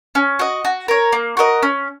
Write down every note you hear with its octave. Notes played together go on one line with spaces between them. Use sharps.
C#4
F#4 D#5
F#4
A#4 C#5
A#3
F#4 A#4 D#5
C#4